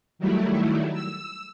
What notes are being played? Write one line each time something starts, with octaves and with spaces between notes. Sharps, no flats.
D#3 F#3 G3 A3 E4
E6